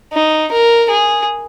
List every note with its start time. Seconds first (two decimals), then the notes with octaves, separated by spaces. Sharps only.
0.13 D#4
0.51 A#4
0.90 G#4